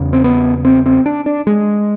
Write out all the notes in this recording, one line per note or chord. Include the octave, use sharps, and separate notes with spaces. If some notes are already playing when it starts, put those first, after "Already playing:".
Already playing: E2 C#3
C4
B3
C4
C4
D4
D4
G#3